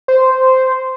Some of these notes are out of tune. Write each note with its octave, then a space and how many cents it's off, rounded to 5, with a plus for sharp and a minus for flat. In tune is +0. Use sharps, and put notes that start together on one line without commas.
C5 -10